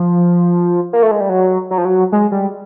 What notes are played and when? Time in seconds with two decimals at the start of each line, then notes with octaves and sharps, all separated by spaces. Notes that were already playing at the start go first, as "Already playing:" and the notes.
Already playing: F3
0.93 A#3
1.03 A3
1.11 G#3
1.21 G3
1.29 F#3
1.71 F#3
1.78 F3
1.85 F#3
2.12 G#3
2.32 G3